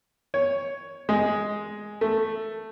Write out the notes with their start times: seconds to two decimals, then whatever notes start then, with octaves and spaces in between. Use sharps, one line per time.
0.34 C#5
1.09 G#3
2.01 A3